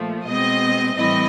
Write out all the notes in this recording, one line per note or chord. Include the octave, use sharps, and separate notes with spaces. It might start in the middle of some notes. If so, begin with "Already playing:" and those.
Already playing: A#2 F3 A3
B2 G#3 C4 D#5
A2 E3 G3 C4 E4 D#5